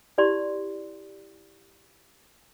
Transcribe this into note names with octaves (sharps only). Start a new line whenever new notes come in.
E4 G4 D5 C6